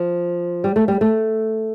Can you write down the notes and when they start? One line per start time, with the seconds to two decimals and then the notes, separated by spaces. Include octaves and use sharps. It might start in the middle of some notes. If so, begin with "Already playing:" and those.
Already playing: F3
0.64 G3
0.76 A3
0.88 G3
1.01 A3